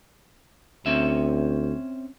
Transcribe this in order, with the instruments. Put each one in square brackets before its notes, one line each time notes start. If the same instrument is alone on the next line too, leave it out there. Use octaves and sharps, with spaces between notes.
[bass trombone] D2 [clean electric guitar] C4 C#4 E5